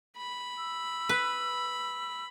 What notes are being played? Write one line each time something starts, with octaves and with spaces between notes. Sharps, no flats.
B5
E6
B4